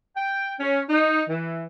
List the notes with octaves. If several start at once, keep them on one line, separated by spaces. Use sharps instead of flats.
G5
C#4
D#4
E3